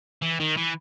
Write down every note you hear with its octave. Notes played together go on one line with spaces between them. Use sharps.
E3
D#3
E3